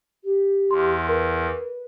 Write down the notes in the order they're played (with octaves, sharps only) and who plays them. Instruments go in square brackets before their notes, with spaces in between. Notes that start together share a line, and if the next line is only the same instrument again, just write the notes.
[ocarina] G4
[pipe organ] E2 [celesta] C6
[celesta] A#4 [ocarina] B4